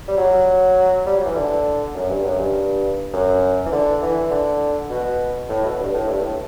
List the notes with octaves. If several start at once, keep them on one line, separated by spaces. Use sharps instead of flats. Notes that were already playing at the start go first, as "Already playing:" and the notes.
G3
F#3
G3
F#3
E3
D3
F#2
G2
F#2
G2
F#2
E3
D3
E3
D3
B2
A2
B2
G2
A2
G2
A2